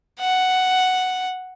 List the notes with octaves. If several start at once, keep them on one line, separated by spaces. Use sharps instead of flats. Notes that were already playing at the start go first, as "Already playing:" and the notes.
F#5